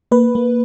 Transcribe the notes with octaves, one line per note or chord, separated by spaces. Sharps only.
A#3 B4
A#3